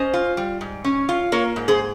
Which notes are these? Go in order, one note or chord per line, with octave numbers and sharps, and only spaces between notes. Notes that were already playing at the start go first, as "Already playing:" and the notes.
Already playing: C#4 C5 D#5
F4
G3
G#2
C#4
F4
A#3 A#4 C#5
G#2
G#4 C5